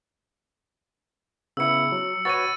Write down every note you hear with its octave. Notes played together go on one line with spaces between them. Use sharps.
C#3 B3 E4 E6 C#7
F#3
F#4 B4 C#5 A6 D#7